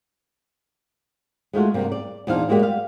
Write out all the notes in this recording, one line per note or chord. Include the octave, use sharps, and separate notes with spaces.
G#3 A3 F4 F#4
G2 C3 A#3
D5
E2 A#2 D4 D#4 C5 F5
G#3 A#3 F#4 G4 D5
G3 F5